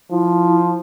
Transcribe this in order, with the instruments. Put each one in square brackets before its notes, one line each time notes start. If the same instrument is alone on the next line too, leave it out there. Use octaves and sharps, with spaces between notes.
[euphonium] F3 [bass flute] E4